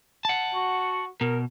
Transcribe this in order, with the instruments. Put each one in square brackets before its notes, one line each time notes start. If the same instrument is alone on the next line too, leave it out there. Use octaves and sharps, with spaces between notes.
[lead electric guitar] F#5 A5
[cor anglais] F#4
[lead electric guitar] B2 [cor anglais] A#4